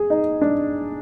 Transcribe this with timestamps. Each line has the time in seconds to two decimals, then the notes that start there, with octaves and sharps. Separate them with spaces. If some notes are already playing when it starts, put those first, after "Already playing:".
Already playing: G#4
0.10 D#4
0.41 D4